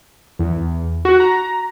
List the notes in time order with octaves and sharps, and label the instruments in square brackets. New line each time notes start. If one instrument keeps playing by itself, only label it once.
[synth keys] E2
F#4
A#5